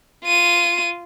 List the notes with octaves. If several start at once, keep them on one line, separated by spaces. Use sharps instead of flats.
F4 D#7